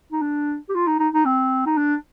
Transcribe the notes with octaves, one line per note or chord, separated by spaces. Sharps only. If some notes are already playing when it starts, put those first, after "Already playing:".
D#4
D4
G4
F4
D#4
D#4
D#4
C4
D#4
D4